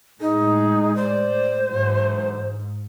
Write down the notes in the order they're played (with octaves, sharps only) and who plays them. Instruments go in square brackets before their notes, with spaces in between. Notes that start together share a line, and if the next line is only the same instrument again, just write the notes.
[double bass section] A2 G#3 [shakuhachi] D#4 [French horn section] G#4
[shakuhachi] C5 [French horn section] D5
[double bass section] G#2 [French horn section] D3 E3 F#3